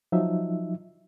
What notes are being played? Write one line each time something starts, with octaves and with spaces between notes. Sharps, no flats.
F3 F#3 D#4 E5